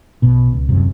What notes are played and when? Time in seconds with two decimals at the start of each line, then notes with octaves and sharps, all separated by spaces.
0.22 B1 B2
0.53 C#2
0.69 D#1 F#2 C3